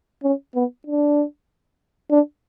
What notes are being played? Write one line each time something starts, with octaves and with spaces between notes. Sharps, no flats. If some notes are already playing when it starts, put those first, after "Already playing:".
C#4
B3
D4
D4